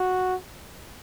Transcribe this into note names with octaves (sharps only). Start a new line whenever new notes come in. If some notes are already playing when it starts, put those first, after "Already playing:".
Already playing: F#4